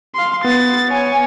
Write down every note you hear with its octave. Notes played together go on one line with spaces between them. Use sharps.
F5 C6
B3 A6
C#5 G#5